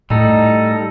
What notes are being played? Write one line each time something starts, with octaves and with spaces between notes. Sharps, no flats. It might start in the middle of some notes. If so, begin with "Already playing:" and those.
A2 G3 A3 D#4 A4